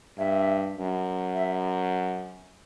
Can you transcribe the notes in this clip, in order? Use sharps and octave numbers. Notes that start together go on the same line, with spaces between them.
G2 E5
F#2
E5